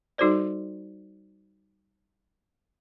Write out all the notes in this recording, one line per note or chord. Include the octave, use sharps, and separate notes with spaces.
G3 D#4 F#4 A4 C5 D5